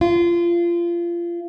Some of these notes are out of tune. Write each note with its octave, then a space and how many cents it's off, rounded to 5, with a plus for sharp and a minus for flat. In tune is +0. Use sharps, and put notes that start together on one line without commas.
F4 -25